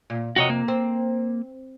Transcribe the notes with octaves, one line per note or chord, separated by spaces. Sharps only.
A#2
F2 C3 F#4 A#4 C#5 D#5
A#3
C4